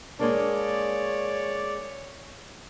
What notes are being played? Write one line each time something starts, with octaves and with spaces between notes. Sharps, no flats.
G#3 A#3 D4 C#5 D5